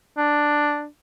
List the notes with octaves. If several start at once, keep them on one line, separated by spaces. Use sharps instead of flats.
D4